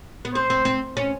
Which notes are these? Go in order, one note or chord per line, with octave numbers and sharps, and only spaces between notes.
B3
C4 C5
C4
C4
C#4